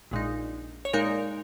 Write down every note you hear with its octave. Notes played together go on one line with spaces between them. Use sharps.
A#1 A#2 G#3 D#4
C#5
A#2 G#3 D#4 A#4